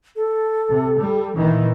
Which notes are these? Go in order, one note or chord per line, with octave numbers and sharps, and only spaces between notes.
A4
C3
G3
A#2 D#3 E3